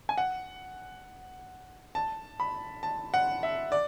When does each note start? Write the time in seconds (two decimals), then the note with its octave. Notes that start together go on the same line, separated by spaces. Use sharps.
0.09 G#5
0.18 F#5
1.95 A5
2.40 B5
2.83 A5
3.14 F#5
3.43 E5
3.72 D5